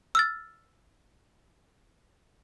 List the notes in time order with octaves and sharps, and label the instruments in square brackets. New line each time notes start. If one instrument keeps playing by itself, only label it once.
[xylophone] E6 F6 A6